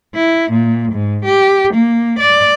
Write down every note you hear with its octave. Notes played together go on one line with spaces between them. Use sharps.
E4
A#2
G#2
G4
A#3
D5